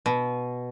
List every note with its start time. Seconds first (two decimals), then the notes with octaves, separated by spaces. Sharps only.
0.06 B2